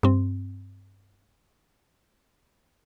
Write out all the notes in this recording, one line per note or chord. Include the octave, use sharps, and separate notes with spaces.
G2 C4